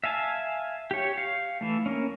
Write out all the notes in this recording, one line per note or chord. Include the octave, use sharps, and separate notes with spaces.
E5 F5 G#5 A5
G4 C#5
F5
E3 A3
A#3 C#4